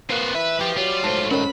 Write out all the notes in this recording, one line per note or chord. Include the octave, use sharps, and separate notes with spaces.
A#3 C4 F4 F#4 B4
E3 B4 E5
F3 G4 D6
F#3 G3 F4
G#2 A3 C5 A5
D#3 C#4 C#5 B5